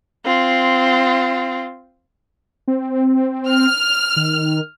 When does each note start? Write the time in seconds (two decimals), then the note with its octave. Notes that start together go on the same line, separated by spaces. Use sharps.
0.25 C4 F4
2.68 C4
3.48 F6
4.16 D#3